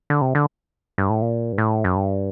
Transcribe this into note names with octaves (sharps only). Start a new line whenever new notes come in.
D3
C3
D3
G2
A2
A#2
G2
A2
F#2
G2